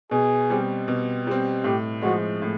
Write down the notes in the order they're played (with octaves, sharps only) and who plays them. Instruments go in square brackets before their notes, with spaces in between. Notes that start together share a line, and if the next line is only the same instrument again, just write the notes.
[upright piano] B2 [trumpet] G#4
[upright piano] G3 C4
B2
G3 C4
[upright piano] A2 [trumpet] G4
[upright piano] F3 G#3 [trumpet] F#4
[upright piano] A2